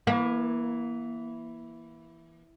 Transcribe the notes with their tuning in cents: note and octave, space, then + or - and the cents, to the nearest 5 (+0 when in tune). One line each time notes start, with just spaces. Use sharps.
E3 +0 A#3 +30